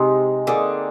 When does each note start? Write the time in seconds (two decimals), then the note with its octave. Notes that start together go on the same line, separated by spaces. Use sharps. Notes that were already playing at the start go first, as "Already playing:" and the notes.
Already playing: C3 G#3 C4 D#4 D#5
0.47 D3 A#3 D#4 G#4 D5